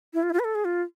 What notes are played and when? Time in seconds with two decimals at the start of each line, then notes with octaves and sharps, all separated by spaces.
0.14 E4
0.23 F4
0.30 E4
0.33 F4
0.39 B4
0.44 A4
0.55 G#4
0.65 F4